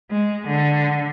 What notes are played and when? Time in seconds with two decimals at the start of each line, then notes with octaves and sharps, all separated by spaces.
0.10 G#3
0.47 D3